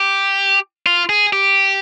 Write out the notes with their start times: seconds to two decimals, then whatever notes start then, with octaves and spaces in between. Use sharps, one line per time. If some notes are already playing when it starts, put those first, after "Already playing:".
Already playing: G4
0.86 F4
1.09 G#4
1.33 G4